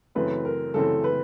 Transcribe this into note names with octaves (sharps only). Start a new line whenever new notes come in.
F#2 C#3 E3 A3 C4 B4
A#4
F#2 C#3 E3 A3 C4 A4
B4